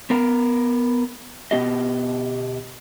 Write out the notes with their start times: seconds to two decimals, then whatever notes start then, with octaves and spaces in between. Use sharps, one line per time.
0.10 B3 A#4
1.51 B2 B3 G4 D#5